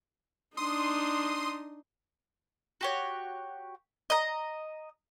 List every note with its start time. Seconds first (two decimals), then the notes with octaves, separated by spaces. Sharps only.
0.57 D4 D#4 C6 D#6
2.81 F#4 G4 C#5
4.10 D#5 A#5